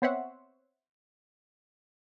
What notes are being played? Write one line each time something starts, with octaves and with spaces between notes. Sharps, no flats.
B3 C4 C5 C#5 E5 F#5